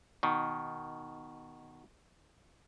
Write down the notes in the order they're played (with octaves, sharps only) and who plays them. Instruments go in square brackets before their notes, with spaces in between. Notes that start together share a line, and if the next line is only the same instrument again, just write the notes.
[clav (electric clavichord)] B2 D#3